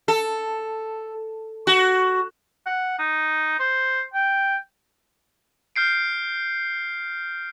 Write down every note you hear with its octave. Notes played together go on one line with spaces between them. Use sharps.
A4
F#4
F#5
D#4
C5
G5
F6 G6 C7 D7